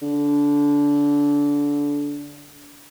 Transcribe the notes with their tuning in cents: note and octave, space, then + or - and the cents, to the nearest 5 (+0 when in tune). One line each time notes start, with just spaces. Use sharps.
D3 -25